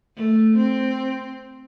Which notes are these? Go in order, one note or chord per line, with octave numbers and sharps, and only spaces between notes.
A3
C4